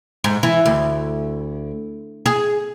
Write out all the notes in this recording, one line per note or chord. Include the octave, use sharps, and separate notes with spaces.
G#2
E3
D2
G#4